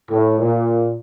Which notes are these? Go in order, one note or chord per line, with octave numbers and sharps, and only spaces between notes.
A2
A#2